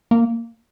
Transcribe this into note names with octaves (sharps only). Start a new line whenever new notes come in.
A#3